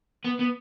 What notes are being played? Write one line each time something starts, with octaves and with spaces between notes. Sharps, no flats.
B3
B3